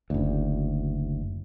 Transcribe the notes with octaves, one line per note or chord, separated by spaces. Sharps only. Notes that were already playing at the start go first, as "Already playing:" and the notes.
F#1 D2